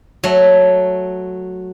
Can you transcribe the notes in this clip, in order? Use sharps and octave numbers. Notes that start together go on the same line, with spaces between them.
F#3 A3